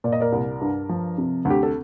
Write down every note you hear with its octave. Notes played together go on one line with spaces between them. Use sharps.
A#2 D5
D#5
A#4 D5
C2
G2
F3
C3
D2
G4
A4